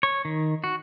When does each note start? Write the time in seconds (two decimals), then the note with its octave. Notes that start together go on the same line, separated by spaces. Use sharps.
0.03 C#5
0.25 D#3
0.64 F#4